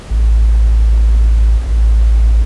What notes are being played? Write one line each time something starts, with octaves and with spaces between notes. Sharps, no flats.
A1
A1